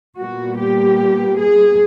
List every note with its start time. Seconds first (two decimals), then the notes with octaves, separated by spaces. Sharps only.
0.17 A#2 G3 B3 F#4
0.57 G4
1.38 G#4